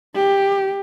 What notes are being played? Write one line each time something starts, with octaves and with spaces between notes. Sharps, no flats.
G4